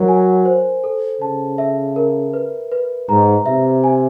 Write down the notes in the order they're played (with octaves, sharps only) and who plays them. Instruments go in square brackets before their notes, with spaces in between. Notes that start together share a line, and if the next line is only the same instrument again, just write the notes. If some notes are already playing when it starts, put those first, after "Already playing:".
Already playing: [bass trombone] F#3 [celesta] A#4
[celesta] G#5
C5
A4
[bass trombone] C#3 [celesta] A5
[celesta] E5
A#4
B4
B4
[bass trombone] G#2 [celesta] A#5
[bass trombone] C3 [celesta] E5
[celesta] G#5